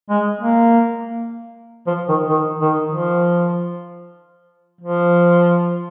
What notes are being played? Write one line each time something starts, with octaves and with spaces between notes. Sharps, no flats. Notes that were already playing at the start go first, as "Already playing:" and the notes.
G#3
A#3
F3
D#3
D#3
D#3
F3
F3